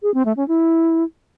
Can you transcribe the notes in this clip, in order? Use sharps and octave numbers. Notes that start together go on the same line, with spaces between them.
G#4
C4
A3
C#4
E4